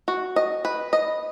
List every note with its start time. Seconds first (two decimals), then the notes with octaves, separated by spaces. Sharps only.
0.08 F#4
0.36 D#5
0.65 B4
0.93 D#5